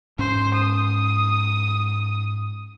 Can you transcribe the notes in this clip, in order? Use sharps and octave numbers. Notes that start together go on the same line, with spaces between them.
G#2 C#4 C5
D#6